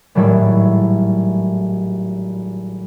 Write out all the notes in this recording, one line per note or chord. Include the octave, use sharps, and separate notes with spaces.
G#1 A2 F#3 G3 E4